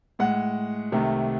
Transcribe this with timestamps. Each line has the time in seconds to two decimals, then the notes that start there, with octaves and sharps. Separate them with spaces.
0.19 A2 G#3 F#5
0.92 C2 C3 D#3 A3